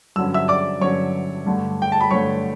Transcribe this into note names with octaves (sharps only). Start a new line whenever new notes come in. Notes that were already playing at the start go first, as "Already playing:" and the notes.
G2 D3 F#3 C#4 E6
E5 E6
D5 D6
G2 D3 F#3 C#4 C#5 C#6
G2 D3 A3
G5
A5
B5
G2 D3 A3 C#5 C#6